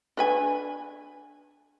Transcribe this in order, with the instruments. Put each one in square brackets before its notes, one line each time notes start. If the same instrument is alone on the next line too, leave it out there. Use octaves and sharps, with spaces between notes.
[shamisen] D4 B4 G#5